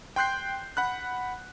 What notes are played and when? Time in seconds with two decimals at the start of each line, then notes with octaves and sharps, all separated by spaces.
0.16 G5 C6 F#6 G6 C7
0.77 F#5 B5 F#6